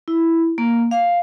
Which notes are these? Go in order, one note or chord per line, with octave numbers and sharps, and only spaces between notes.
E4
A#3
F5